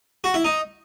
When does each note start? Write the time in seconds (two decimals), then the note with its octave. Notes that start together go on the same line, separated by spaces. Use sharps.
0.24 F#4
0.34 E4
0.44 D#4